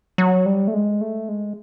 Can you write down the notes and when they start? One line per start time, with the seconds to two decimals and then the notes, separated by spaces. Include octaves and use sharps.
0.18 F#3
0.46 G3
0.68 A3
0.74 G#3
1.01 A3
1.29 G#3